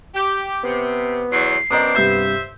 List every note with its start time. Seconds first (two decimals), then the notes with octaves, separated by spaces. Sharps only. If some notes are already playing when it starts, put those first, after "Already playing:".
0.14 G4
0.64 C3 B3
1.32 E2 F#3 C7
1.71 F#2 B3 C4 D4 D#5 A#5 D#6
1.95 G2 C3 C5 E5 G6